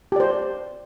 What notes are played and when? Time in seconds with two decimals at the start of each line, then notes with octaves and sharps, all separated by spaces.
0.12 G4
0.16 D5
0.20 C5